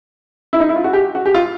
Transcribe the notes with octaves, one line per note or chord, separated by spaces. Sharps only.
E4
D#4
E4
F4
F#4
G4
F#4
G4
F4